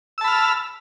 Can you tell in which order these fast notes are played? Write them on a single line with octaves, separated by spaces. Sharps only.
E6 A5 B5 F6